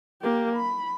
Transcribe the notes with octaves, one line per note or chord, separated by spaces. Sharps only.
A#3 G4
B5